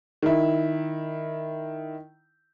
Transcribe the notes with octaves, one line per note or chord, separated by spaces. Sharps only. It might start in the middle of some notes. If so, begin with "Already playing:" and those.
D#3 E4